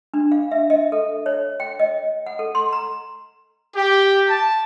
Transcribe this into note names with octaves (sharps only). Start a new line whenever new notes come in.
D4
F5
E5
D#5
A4
C#5
G5
D#5
F#5
A4
C6
A#5
G4
A5